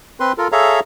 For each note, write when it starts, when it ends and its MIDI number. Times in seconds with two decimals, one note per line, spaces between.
0.20 0.32 60
0.20 0.32 71
0.20 0.32 84
0.38 0.48 65
0.38 0.48 69
0.38 0.48 70
0.52 0.80 68
0.52 0.80 69
0.52 0.80 73
0.52 0.80 76
0.52 0.80 77
0.52 0.80 82